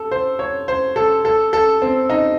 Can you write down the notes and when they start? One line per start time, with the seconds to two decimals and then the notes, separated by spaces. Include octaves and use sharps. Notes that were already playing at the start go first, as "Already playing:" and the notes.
Already playing: A4
0.11 C5
0.39 C#5
0.68 C5
0.96 A4
1.25 A4
1.53 A4
1.82 C4
2.10 D#4